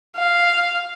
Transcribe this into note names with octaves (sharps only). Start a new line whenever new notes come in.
F5